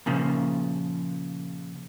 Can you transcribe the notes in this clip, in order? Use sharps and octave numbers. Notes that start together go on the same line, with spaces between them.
A#2 C#3 F3